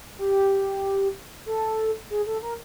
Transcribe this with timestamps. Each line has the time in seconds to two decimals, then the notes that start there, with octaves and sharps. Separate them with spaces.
0.18 G4
1.46 A4
2.10 G#4
2.26 A4
2.42 A#4